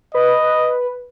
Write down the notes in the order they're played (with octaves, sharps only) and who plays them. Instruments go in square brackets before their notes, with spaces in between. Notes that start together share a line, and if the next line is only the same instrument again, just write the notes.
[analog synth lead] B4 [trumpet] D#5